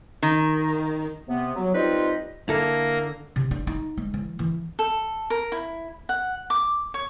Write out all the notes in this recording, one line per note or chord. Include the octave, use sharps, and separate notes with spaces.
D#3
C3 B3
F#3
G3 C4 D#4 F4 B4 D#5
D3 A#3 E4 A4 A#6
C3
D4
D#4
G#3
E3
E3
A4
A#4
E4
F#5
D6
C#5